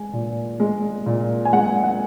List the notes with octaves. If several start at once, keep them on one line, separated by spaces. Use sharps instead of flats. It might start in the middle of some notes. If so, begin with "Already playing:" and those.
Already playing: G#3 G#5
A#2
G#3
A#2
G#5
G#3 F#5
F#5